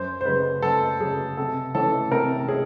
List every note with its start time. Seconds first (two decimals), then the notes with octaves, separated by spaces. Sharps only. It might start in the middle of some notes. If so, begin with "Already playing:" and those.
Already playing: F#2 C5
0.21 C5
0.26 C#3 F#3 B4
0.62 F#2 A4
1.00 C#3 F#3 G#4
1.37 C3 A4
1.75 E3 A3 C#4 A4
2.11 C3 A#4
2.48 C#4 G#4